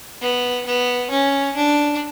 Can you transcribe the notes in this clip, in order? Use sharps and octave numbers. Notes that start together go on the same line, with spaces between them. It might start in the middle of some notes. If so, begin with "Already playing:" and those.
B3
B3
C#4
D4